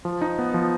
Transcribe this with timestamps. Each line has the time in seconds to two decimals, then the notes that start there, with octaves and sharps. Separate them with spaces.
0.05 F3
0.22 D#4
0.39 B3
0.54 F3